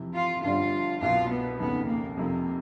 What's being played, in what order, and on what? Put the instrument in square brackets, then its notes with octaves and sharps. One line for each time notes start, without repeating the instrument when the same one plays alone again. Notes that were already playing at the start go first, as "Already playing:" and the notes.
Already playing: [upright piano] F2 C3 E3
[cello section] F4
[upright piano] G1 G2 D3 G3 [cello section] F4
[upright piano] C2 B2 F#3 [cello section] F4
[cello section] B3
[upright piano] F1 D#2 C#3 [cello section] B3
[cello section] A#3
[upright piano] F1 F2 C3 [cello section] A#3